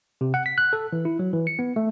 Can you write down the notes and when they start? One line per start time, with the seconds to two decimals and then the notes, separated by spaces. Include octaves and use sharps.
0.21 C3
0.34 F#5
0.46 B6
0.58 F#6
0.73 A4
0.93 E3
1.05 E4
1.19 F#3
1.33 E3
1.47 C#7
1.59 B3
1.76 A3